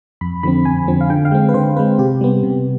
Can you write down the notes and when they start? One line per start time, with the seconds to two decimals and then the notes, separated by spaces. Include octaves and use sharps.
0.21 F2 B5
0.43 D3 F3 C4 B5
0.65 F2 G#5
0.88 D3 F3 C4
1.01 F5
1.10 D3 G5
1.25 F5
1.32 G#3 C4
1.49 B4
1.54 D3 C5
1.76 G#3 C4 B4
1.99 C3 G4
2.21 G3 B3
2.43 C3